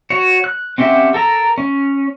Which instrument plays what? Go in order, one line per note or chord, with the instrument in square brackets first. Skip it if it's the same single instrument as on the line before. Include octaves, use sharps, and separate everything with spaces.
[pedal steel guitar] F#4 C#5
F#6
C4 C#4 G4 E5 F#5
A4 A#4 A#5
C#4